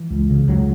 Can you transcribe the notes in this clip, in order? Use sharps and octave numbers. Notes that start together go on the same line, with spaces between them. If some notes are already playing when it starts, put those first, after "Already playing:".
Already playing: E3
C#2
C#3
C#2 F#3